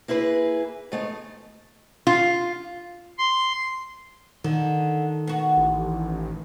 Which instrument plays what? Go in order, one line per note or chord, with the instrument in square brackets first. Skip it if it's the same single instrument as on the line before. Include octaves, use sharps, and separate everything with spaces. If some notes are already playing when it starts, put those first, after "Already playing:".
[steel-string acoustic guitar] A#3 E4 G#4 B4
G#2 A3 B3
[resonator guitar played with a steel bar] F4
[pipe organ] C6
[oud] D3 [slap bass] D#3
[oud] B3 F#4
[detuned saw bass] A1